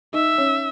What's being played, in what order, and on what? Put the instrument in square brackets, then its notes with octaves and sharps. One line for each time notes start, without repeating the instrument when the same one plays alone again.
[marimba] D#4 D#5 [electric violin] E5
[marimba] C#4 C#5